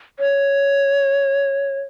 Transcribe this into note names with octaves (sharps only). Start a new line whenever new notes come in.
C#5